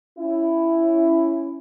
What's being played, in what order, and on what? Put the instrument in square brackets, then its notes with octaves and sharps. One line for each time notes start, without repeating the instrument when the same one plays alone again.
[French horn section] C#4 E4